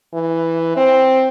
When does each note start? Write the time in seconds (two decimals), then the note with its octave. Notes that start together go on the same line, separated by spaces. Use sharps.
0.14 E3
0.76 C4